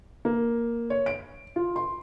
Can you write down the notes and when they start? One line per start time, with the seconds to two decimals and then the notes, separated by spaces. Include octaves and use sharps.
0.25 A#3
0.90 C#5
1.06 D7
1.56 F4
1.76 C6